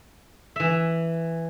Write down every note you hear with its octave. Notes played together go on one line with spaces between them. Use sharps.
E3 E5